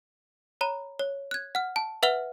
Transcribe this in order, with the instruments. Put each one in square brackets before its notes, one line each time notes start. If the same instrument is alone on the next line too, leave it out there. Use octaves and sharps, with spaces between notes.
[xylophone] C#5 A#5 B5
C#5
F#6 G#6
F#5 F6
A5
B4 E5 F#5 F6 F7 G7